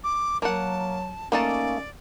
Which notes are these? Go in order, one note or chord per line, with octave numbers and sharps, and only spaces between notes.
D6
F#3 A#3 F#5 A5
A3 A#3 C#4 D#4 D5 A5